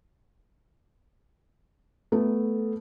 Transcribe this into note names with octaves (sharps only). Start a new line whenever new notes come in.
A3 B3 A4